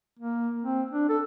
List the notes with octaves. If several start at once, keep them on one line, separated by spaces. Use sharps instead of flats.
A#3
C4
D4
A4